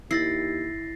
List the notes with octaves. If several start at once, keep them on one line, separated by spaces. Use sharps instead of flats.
D#2 E4 A6 A#6 C7